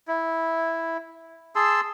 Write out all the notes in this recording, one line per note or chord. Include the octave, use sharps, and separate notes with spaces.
E4
G#4 A5 C6 E6